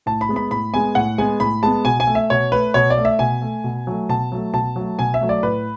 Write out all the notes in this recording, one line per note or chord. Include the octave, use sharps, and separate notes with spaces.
A2 A5
B5
G#3 B3
B5
A2 B5
G#3 B3 G#5
A2 F#5
G#3 B3 G#5
A2 B5
G#3 B3 A5
B2 G#5
G#5
A3
E5
B2 C#5
A3 B4
B2 C#5
D5
A3
E5
B2 G#5
A3
B2
F#3 A3
B2 A5
F#3 A3
B2 A5
F#3 A3
B2 G#5
E5
F#3 A3
D5
A2 B4